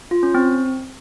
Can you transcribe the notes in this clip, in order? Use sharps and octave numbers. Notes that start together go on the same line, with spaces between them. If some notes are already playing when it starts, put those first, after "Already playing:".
F4
C#4
C4